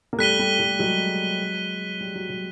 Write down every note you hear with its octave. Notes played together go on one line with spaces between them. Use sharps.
A#3
G3 A3 F#6 B6 D#7 G7
G3
G3 A3
F#3 G#3
G3
F#3
F#3